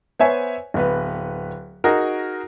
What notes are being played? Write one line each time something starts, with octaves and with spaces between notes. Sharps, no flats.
B3 C5 C#5 E5 G#5
D1 B3 B4
D#4 F#4 G#4 A#4